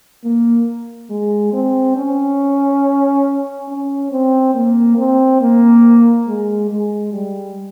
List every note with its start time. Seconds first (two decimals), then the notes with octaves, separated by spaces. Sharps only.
0.24 A#3
1.10 G#3
1.53 C4
1.96 C#4
3.68 C#4
4.12 C4
4.54 A#3
4.98 C4
5.41 A#3
6.27 G#3
6.70 G#3
7.13 G3